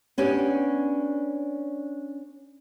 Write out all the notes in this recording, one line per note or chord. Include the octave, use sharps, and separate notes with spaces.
B3 C#4 D4 G4